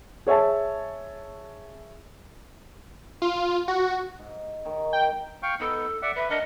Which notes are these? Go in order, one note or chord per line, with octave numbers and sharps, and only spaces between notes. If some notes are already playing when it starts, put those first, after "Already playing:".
G#4 C#5 E5 G#5 A5
F4
F#4
G#2
D#3 C#5 B5
G5
F5 G5 C#6
B3 D#4 A4
D5 E5 F#5
B4 E5
D4 A#4 D#5 F#5